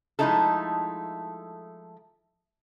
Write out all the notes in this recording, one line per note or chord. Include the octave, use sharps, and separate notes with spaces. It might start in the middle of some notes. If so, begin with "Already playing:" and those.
F3 G#3 A3 D#4 E4 A4